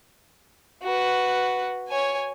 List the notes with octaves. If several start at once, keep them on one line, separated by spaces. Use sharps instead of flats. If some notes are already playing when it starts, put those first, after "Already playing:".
F#4 B4
C#5 G#5